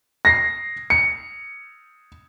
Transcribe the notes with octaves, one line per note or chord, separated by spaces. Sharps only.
A#6 C7
C#7